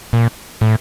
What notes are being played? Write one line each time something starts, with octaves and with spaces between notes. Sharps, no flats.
A#2
A2